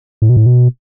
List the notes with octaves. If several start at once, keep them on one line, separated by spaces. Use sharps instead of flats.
A2
B2
A2
B2